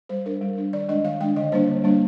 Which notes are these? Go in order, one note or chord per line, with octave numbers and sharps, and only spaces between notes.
G3 C5
D4 A#4
G3
D4
D#3 D5
G#3 D4 D#5
D#3 F5
G#3 D4 G5
D3 D#5
G3 A#3 D4 C5
D3
G3 A#3 D4